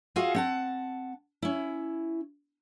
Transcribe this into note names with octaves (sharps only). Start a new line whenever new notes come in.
F4 F#4 G#4 E5 F5
C4 F#5 A5
C#4 E4